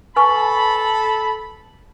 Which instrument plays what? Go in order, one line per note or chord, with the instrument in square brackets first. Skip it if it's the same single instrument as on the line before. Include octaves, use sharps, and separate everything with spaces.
[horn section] A4 A5 B5 [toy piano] B4 G#5 C#6